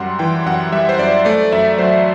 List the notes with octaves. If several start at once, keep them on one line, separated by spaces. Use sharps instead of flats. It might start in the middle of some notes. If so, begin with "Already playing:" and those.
Already playing: F#2 G3 F#5 C6
E3 G5
F#2 F#5
G3 E5
C5
F#2 D5
A3 D5
F#2 E5
F#3 C5